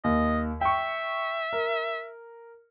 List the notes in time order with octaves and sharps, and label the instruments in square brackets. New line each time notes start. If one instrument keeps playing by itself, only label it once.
[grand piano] D#2 [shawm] D#5
[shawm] E5 [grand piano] G5 C#6
[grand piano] A#4